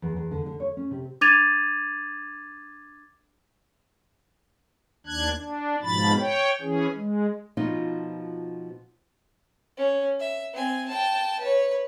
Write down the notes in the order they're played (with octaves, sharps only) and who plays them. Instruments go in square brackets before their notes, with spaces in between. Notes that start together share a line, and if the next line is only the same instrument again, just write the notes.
[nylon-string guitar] E2
E2
D3
D3
C#5
C#4
C3
[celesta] D4 D6 G#6 A6 D#7 F7
[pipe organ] D#2 D4 F#6 G#6
D4
G#2 B2 F3 B5 A6
C#5 G5
E3 C#4 G#4
G#3
[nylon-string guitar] B2 F3 B3 D#4 F4
[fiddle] C#4
E5
C4 G#5
G5 A5
B4 C#5